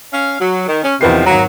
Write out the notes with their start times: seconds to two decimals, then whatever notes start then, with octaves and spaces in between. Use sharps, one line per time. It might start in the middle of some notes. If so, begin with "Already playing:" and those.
0.13 C#4 F5
0.40 F#3
0.68 D#3
0.83 C#4
1.01 E2 C3 D#3 F3 B4 C7
1.26 G#1 F#3 A#5